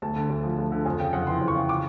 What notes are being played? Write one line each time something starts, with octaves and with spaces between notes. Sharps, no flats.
D2 A5
D3
D2
F3
D2
D3
F2 G#5
C#3 G5
F2 F#5
E3 C6
F2
C#6
C#3
D6